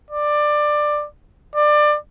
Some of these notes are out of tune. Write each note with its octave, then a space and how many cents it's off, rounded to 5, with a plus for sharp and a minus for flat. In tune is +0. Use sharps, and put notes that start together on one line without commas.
D5 +15
D5 +25